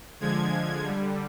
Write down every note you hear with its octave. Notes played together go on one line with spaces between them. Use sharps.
D3 F3 G#3 G#6
D3 G3